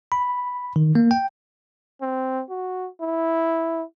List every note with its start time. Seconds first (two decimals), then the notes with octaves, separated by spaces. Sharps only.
0.12 B5
0.76 D#3
0.95 A#3
1.11 G5
2.02 C4
2.50 F#4
3.01 E4